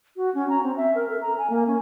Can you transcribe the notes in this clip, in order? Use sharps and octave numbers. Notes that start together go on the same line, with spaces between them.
F#4
C#4
A#5
C4
E5
A#4
A4
A#5
G#5
A#3
C#4